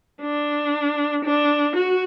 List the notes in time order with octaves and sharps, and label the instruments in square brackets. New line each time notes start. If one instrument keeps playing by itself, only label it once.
[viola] D4
D4
F#4